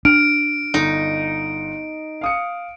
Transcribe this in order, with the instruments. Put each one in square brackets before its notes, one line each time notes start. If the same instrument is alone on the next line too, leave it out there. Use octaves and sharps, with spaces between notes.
[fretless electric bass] D4 [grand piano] F6 [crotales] D7
[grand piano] G1 [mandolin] D#4
[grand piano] F5 D#6 C#7